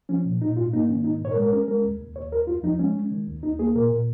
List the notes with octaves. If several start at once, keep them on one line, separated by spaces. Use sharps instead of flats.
F3 C#4
A#2
A#2 D#4
G#2 F4
A#3 D#4
D#3 C#4
G#2 D#4
A#2 C#5
A#4
G#3
A#4
C#4 A#4
G#3 A#4
D#2
D#2
D#2 C#5
D#2 A#4
F2 F4
F3 D#4
G#3 C#4
G#3
D#3
D#2
D#2 D#4
A#3 G#4
A#2 A#4
A#2